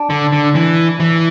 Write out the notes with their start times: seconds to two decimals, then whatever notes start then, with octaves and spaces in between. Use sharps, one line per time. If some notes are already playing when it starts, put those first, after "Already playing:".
Already playing: D4
0.10 D3
0.32 D3
0.55 E3
1.00 E3